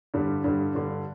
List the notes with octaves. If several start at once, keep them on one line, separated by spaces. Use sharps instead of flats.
G2 D3 G3
G2 D3 G3
G2 D3 G3